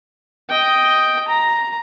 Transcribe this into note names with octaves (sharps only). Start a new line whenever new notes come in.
D#5 G5
A#5